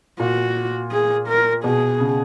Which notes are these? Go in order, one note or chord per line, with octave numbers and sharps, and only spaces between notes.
A#2 F#4
G#4
A#4
B2 G#4
C#3